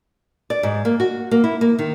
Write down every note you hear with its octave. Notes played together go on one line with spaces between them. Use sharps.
D5
G#2
A#3
F#4
A#3
E4
A#3
D#3